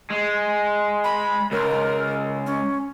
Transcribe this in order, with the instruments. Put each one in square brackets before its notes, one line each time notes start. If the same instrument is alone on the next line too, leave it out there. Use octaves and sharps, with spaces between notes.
[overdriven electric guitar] G#3
[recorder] B5
[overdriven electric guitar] C#2 [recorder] A#4
[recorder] C#4